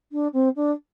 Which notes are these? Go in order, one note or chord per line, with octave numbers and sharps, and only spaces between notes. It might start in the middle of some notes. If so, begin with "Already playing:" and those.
D4
C4
D4